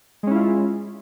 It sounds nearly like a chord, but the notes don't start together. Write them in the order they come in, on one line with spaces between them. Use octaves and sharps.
G#3 C#4 E4 F4